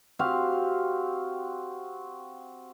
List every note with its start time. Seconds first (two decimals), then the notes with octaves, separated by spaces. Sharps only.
0.19 C4 F#4 G4 F5